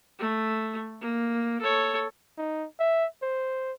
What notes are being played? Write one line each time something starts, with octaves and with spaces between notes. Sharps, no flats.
A3
A#3
A4 C#5
D#4
E5
C5